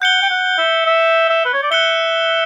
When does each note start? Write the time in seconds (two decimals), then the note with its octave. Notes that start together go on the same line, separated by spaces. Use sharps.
0.02 F#5 G6 C#7 G7
0.23 G5
0.30 F#5
0.58 E5
0.86 E5
1.29 E5
1.45 B4
1.53 C#5
1.63 D5
1.71 E5 F#6 C#7 G7